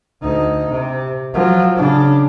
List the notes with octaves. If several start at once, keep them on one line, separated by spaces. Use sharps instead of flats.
D2 D#4
C3
F3 F#3
C#3 D4